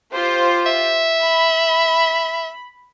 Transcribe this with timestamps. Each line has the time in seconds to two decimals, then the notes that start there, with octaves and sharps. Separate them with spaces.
0.13 F4 G4 C5
0.66 E5
1.21 B5